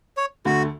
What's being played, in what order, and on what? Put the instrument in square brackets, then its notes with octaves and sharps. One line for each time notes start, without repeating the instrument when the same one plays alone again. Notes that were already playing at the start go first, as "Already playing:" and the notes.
[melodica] C#5
[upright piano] D2 D3 A3 [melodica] F#4